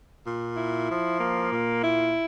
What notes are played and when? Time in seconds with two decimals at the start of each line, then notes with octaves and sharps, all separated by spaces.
0.24 A#2
0.56 E4
0.88 F3
1.19 A#3
1.50 A#2
1.82 E4